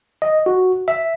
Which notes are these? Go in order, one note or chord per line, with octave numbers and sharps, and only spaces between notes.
D#5
F#4
E5